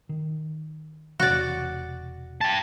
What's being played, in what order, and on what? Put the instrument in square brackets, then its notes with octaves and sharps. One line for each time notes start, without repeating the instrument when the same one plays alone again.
[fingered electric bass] D#3
[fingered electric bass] E1 C3 E3 [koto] F#4 D5
[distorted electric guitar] G5 A5